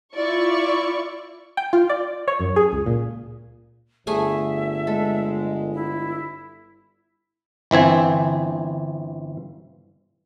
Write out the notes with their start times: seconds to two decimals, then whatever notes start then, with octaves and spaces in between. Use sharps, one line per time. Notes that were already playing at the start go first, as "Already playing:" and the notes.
0.15 E4 F4 D5 C#6
1.57 G5
1.73 F4
1.89 D5
2.28 C#5
2.40 F#2
2.56 G#4
2.72 C#2
2.86 A#2
4.07 G1 A3 G#4 E5 G#5
4.87 G#3 A4
5.74 E4
7.71 G1 E3 C4 G#5